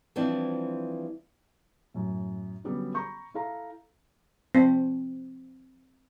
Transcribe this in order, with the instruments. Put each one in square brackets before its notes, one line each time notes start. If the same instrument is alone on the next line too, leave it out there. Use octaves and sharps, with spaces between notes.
[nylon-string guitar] E3 F3 G3 C4 D4 E4
[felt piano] F#2 A2
D3 F#3 G3 B3 C#4
A#5 B5 C#6 G6
E4 A4 F5 A#5
[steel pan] C4